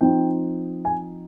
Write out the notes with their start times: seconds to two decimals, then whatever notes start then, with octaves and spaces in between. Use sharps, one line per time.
0.01 F3 C4 D#4 G5
0.85 G#5